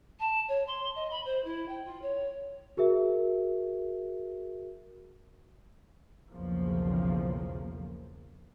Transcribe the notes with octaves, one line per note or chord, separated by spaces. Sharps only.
A5
C#5
C6
D#5
B5
C5
E4
G5
F4
C#5
F#4 G#4 A#4 E5
B1 E2 C#3 F3 A#3